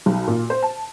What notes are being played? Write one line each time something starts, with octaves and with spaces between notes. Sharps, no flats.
B1
A#2
C5
A5